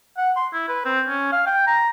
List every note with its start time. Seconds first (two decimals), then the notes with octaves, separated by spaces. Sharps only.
0.18 F#5
0.36 C6
0.53 E4
0.68 B4
0.85 C4
1.08 C#4
1.32 F5
1.47 G5
1.67 A#5